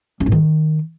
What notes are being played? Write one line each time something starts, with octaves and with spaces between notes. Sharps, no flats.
C#4
G#2
D#3